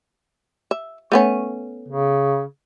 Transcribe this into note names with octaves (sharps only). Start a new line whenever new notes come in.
E5
A3 B3 C#4
C#3